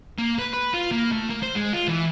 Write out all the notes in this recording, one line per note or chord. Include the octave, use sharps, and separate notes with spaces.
A#3
B4
B4
F4
A#3
A3
A#3
C5
G#3
F4
E3